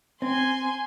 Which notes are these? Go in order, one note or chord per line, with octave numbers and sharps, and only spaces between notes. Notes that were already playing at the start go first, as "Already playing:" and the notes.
C4 G#5 C6